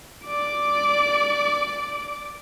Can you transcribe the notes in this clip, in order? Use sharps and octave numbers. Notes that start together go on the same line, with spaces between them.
D5 D6